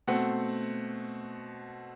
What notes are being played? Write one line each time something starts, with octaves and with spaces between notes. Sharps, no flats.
B2 A3 C4 F#5